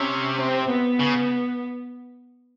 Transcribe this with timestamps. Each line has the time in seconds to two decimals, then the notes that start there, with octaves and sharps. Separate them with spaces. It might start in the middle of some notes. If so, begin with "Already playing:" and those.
Already playing: C3 C#4
0.40 C4
0.70 B3
1.00 C#3